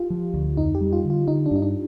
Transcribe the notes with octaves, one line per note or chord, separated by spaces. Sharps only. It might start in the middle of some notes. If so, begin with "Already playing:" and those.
Already playing: F4 G4
F3
D2
F2 D#4
G4
G3
F4
D3
F4
D3 D#4
D4
G2 D#4
D4